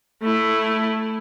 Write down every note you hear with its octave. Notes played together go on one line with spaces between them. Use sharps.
A3 E4